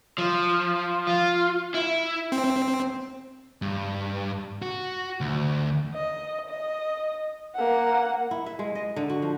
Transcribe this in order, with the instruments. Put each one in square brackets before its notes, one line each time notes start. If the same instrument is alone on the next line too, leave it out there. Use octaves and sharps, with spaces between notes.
[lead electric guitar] F3
F4
E4
[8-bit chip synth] C4
[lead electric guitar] G2
F#4
D2
[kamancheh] D#5
D#5
A#3 F#5
[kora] E4
E5
G#3
D#5
D3
F#4
F3